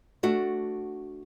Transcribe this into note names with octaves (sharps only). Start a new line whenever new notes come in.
A3 D4 F#4